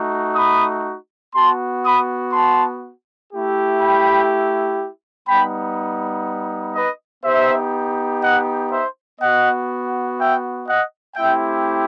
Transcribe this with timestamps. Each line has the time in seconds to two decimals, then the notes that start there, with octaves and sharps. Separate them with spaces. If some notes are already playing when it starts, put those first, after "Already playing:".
Already playing: A3 D#4 F#4
0.36 B5 D#6
1.35 B3 F#4 A5 C6
1.84 B5 D#6
2.33 A5 C6
3.31 A3 E4 G4
3.80 G5 B5
5.27 G3 B3 D#4 G5 B5
6.74 B4 D#5
7.24 B3 D#4 G4 C5 E5
8.22 D#5 F#5
8.71 C5 E5
9.20 B3 F#4 D#5 F#5
10.18 E5 G5
10.68 D#5 F#5
11.16 A3 C4 E4 G4 E5 G5